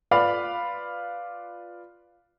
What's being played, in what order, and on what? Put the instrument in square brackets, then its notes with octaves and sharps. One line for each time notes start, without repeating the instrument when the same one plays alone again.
[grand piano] F4 B4 D5 F5 B5